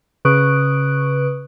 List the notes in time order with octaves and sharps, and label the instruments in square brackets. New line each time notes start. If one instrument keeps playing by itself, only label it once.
[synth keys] C#3 B4 C#6 D#6 F#6 D7